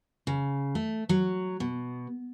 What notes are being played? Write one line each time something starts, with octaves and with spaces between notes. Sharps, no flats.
C#3
A3
F#3
B2